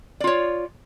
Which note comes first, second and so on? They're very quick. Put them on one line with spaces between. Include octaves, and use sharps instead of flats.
D5 F4 C#5